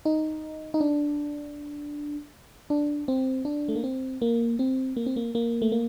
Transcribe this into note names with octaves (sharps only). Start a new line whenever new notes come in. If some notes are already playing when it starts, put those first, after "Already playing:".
D#4
D#4
D4
D4
C4
D4
A3
A#3
C4
A#3
C4
A#3
C4
A#3
A#3
A3
A#3